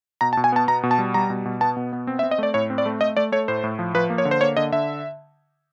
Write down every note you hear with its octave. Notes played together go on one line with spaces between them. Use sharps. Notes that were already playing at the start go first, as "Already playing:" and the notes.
B2 A#5
A5
B2
G#5
B3 A5
B2 A#5
B2
A5
G3
G3 A#5
B2
B2
B3 A5
B2
B3
C4
E5
C4
D#5
A3 D5
A2 C#5
C4
D5
A3
A3 D#5
A3 D5
A3 C#5
A2 C5
A2
F3
F3 B4
A#3
C#5
D3
C5
A#3 C#5
D3 D#5
D3 E5